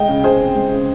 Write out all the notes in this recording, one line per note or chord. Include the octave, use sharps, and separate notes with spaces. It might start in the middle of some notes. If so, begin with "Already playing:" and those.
Already playing: G#3 D#5 G5
C#3
C#3 G#4 C5
C4
G#3
C#3